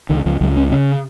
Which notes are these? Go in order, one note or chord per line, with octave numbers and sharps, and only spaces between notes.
C#2 D#3
C#2 F3
C#2 F#3
C#3 C#4
C#3 C#4